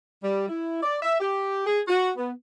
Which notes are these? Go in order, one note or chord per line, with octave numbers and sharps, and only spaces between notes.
G3
E4
D5
E5
G4
G#4
F#4
B3